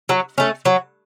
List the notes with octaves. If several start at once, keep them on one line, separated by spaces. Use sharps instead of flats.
F#3
A3 C#4
F#3